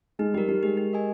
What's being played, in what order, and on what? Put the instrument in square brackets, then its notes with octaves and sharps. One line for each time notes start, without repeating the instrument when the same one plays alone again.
[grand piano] G#3 [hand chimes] D#4
[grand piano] G3 [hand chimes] G4 A#4
[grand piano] G3 [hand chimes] D#4
[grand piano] G#3 [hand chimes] G4 A#4
[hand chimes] G4
A#4 D#5 G#5